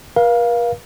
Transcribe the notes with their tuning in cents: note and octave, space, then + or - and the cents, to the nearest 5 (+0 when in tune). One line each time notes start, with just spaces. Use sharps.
A#4 +45 F5 +0